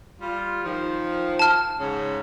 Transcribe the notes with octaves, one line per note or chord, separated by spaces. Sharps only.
G3 F4
D#3 F3
A5 F6
G#2 C#3